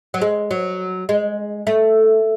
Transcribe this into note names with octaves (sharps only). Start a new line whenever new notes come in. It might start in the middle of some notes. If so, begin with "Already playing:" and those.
F#3
G#3
F#3
G#3
A3